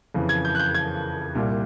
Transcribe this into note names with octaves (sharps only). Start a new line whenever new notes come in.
F2 C#3 E3
G#6
G6
F#6
G6
G#6
C2 A#2 G3